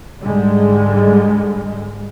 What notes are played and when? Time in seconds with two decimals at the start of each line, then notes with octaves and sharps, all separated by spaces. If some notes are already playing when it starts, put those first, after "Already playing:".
0.23 G#2 D3 G3 G#3